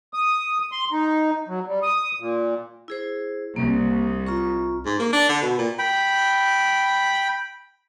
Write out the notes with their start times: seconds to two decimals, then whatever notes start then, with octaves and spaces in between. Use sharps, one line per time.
0.14 D#6
0.72 C6
0.92 D#4
1.48 F#3
1.67 G3
1.82 D#6
2.20 A#2
2.88 E4 G#4 C5
3.56 C2 A#3
4.27 F4 A#5 C#6
4.86 G#2
5.00 A#3
5.13 D4
5.30 D3
5.42 B2
5.58 A#2
5.79 G5 B5